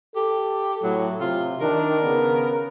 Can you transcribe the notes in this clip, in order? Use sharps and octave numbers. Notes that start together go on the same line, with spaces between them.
G4 A4
A2 F#3
C3 F4
D#3 D4 A#4
C#3 B3